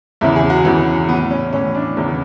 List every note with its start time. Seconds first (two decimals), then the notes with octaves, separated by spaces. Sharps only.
0.21 E2 E4
0.24 C#3 E3
0.36 G#4
0.50 F#4
0.65 E2 C#3 E3
1.09 A2 E3 B3
1.31 C#4
1.53 A2 E3 C#4
1.75 D4
1.97 E2 C#3 E3 C#4